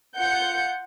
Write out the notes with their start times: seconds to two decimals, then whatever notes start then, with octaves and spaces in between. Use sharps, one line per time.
0.17 F4 F#5 G6 C#7